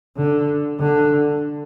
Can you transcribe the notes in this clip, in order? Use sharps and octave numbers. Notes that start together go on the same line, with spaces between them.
D3
D3